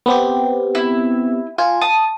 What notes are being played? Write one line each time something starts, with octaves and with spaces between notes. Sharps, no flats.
B3 C4 G4
E4
F4 G#5
A5 D#6